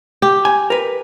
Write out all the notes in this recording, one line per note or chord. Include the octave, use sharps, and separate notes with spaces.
G4
G#5
A#4 B4